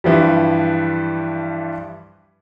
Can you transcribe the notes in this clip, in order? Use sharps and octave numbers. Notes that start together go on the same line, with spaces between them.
G2 E3 F3 G3